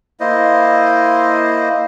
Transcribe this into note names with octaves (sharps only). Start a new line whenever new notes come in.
A#3 E4 C5 D#5